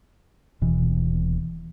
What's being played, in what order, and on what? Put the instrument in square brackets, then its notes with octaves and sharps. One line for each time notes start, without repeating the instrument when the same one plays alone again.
[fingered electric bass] D#1 B2 E3